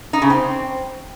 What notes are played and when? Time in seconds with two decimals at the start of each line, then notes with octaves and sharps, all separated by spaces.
0.13 D#4
0.22 C#3
0.30 C4